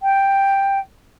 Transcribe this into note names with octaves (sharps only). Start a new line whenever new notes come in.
G5